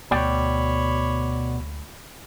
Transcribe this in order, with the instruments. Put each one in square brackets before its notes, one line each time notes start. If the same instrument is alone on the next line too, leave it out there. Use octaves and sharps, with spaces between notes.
[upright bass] D2 [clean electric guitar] B2 D5 G5 [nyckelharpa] C#5 B5